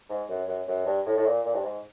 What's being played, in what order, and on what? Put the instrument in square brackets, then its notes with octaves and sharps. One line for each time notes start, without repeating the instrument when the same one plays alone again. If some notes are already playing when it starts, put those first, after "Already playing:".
[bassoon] G#2
F#2
F#2
F#2
G2
A2
A2
A#2
A#2
G2
G#2